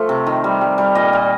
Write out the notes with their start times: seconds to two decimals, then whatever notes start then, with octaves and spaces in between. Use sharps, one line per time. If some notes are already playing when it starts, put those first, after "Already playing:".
Already playing: F3 A3
0.09 C3
0.26 D#3
0.44 G3
0.61 G3
0.78 G3
0.95 A#2 D#5
1.13 A#2